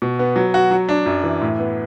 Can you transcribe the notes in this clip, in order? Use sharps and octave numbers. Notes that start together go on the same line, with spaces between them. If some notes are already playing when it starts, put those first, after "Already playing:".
B2
B3
F#3
F#4
F#3
D4
F#2
E3
A2
B3